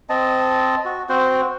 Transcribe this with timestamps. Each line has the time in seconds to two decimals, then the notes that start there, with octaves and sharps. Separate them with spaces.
0.09 C4 D#5 A5
0.85 F#4
1.09 C4 F#4 C5